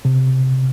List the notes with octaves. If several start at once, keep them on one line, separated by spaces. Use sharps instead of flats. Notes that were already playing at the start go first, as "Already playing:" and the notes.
C3